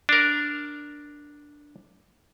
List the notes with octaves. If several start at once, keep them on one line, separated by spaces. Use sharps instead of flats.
D4 A#4